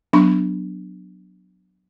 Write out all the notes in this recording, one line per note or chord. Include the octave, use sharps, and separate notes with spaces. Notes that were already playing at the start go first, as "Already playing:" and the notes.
F#3 B3 D4 B5 C#6